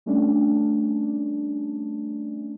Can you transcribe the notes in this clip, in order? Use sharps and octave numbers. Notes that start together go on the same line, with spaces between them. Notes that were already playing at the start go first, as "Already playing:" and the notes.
G3 A3 C#4 D4